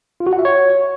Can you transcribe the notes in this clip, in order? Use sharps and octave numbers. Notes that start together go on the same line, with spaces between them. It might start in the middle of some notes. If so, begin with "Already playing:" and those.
F4
F#4
F#5
E5
C#5